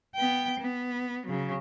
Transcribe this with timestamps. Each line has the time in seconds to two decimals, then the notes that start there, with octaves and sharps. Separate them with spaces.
0.15 B3 G5
0.59 B3
1.26 C#3 F#3